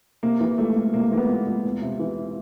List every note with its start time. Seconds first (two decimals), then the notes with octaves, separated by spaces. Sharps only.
0.23 C3 A#3
0.40 E3
0.58 C#2 A3
0.76 C#2
0.93 C3 A#3
1.11 E3 A#3
1.17 B3
1.29 C#2
1.47 C#2
1.64 E2
1.82 C3
2.00 E3